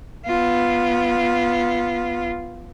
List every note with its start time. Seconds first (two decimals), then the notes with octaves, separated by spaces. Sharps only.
0.26 B3 F4